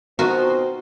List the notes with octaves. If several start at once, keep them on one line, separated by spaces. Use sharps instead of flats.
B2 C4 D#4 F4 F#4 A#4 C5